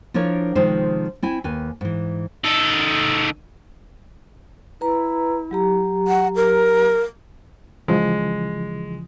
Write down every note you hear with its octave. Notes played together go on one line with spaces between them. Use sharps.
F3 D4 E4 A#4 C#5
C3 D#3 F3 G#3 D#4 C5
C4 E4 G#5
D#2 B4 G#5
G#2 E3
D#3 A4
E4 B4 A#5
F#3 G4 A#5
F#5
A#4
C#3 E3 F3 G#3